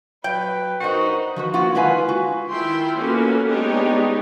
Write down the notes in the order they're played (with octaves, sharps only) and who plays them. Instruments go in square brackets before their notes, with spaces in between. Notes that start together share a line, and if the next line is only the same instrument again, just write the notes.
[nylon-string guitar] F#3 [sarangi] B4 [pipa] G5
[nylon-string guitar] D4 A#4 C5 [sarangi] D#4 [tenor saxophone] F#4
[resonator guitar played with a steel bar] F3 F#4 B4
A#3 F4 F#4 F#5
G#3 E4 F4 B4 G#5
F#4
[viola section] D#3 E4 F4 G5 C6
A#3 B3 C#4 F#4 A4 B4
G#3 B3 D4 D#4 G4 C#5